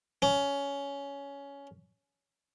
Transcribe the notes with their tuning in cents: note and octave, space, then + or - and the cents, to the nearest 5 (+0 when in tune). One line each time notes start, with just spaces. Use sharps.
C#4 +15